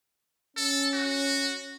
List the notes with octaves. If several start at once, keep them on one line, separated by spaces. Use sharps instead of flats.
C#4 A4
F#4